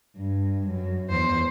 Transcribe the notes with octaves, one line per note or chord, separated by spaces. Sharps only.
G2
F#2
E2 C5